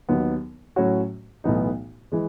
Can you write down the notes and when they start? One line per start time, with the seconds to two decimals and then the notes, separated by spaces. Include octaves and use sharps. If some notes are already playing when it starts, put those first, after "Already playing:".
0.09 D#2 D#3 F#3 B3
0.76 A2 F#3 C#4 F#4 C#5
1.44 B1 A2 E3 B3 D#4
2.12 E3 G#3